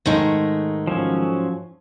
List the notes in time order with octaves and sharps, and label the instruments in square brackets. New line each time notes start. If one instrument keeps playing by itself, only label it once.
[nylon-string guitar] G#2 D#4 A5 [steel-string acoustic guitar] D#3 G#3 A3
[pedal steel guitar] F3 F#3 C#4